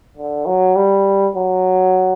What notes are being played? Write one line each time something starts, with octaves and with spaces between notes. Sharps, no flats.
D3
F#3
G3
F#3